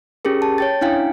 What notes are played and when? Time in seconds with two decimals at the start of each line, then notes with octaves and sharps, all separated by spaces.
0.25 C#4 G4 G#4 A#4
0.42 A5
0.58 C#5 G5 A6
0.81 C#4 D4 E4 F5 G5 G#5